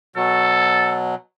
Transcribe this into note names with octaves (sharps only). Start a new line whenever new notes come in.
B2 F#3 A4